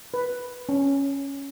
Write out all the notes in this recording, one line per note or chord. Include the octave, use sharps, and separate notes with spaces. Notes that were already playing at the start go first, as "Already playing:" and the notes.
B4
C#4